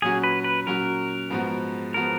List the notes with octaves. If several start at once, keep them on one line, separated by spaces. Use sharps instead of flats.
A#2 F#3 C#4 F#4 G#4
B4
B4
A#2 F#3 C#4 F#4 A#4
G#2 F3 B3 F#4
F3 B3 F#4 A#4